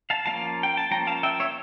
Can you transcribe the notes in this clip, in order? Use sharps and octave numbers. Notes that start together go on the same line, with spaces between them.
F5 A5
F3 A#3 C#4 F5 A5
G5
A5
F3 A#3 C#4 G5 A#5
F5 A5
E5 G5
C#5 E5